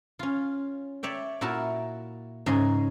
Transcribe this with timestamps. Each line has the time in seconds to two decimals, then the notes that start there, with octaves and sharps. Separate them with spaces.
0.19 C#4 F4
1.03 C#5 D5 E5 G5
1.41 A#2 E4 F#4 A#4 A5
2.46 G#2 C#3 C#4 D#5 G#5